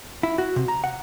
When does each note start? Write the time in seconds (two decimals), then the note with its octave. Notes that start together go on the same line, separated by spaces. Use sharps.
0.23 E4
0.38 F#4
0.56 C3
0.68 A#5
0.84 F#5